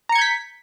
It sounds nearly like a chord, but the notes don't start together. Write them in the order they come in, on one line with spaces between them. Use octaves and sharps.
A#5 C#7 G#6 G6 B6